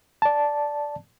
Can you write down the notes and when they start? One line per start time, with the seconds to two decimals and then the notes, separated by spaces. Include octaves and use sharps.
0.22 D5 A5